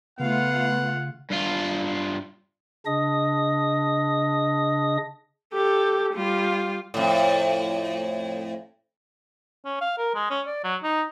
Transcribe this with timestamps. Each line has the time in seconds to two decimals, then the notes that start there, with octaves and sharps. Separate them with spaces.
0.19 C#3 A3 B3 F4 F5 F#5
1.31 G2 F4
2.86 C#3 D4 D#5 D#6
5.54 G4 A4
6.14 G3 F4
6.94 F2 A2
9.65 C#4
9.81 F5
9.98 A#4
10.15 G#3
10.30 C#4
10.46 D5
10.64 F#3
10.83 D#4